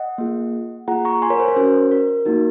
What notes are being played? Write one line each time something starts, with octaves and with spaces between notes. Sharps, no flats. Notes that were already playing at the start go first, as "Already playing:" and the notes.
Already playing: D#5 F#5
A#3 F4 G#4
A#3 F4 G#4 F#5 A#5
A#5 C#6
G#5 C6
A#4 C#5
C5
A#4
C#4 F#4 C5
A#4
A#3 D#4 F#4